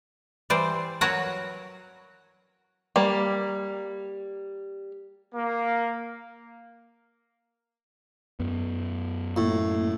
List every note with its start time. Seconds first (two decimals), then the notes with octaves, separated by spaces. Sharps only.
0.50 E3 G3 C5 D5
1.01 F#3 F#4 A#4 B4 C#5 F#5
2.96 G3 A#3
5.35 A#3
8.40 F#2 B3
9.36 A2 A#3